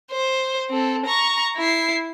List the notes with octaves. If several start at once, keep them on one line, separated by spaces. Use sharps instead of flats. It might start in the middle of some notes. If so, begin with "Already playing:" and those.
C5
C4 A4
A#5 C#6
E4 C7